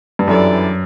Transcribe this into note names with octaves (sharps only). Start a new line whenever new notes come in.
G2
F#2 E3 G3 D4 A4 D5